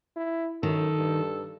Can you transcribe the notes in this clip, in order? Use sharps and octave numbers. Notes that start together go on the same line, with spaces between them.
E4
F#2 D#3 A4
G2